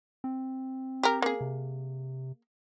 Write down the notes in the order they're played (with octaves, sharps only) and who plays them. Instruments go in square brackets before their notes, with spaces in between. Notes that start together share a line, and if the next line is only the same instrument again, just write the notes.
[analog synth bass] C4
[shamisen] G4 A#4
A#3 G#4
[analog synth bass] C3